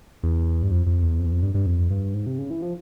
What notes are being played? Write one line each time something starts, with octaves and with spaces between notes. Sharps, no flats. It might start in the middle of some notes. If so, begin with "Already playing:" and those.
E2
G2
F2
F2
E2
F2
E2
F2
G2
G2
F2
G2
G#2
C3
C#3
E3
F3